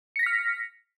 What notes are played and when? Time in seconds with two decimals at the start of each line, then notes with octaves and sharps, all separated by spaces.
0.16 C#7
0.19 A#6
0.23 B6
0.26 F6